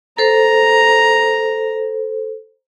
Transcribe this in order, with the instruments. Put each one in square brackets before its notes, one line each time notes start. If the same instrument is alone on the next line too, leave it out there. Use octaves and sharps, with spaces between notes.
[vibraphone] A4 C5 [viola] A#5